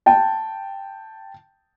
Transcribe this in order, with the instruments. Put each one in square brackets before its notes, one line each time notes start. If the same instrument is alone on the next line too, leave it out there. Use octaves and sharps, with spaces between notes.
[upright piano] G5 A5